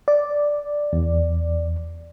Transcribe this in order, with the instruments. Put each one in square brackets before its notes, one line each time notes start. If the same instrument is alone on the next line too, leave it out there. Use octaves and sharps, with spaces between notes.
[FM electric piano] D5
[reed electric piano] E2